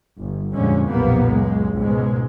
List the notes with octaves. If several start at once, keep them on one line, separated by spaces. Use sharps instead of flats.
G1
C2 F2 A#2 D3 G#3 C#4
B1 F2 A#2 G3 A#3 B3
C#2 F#2 G#3
C#2 G#2 B2 G#3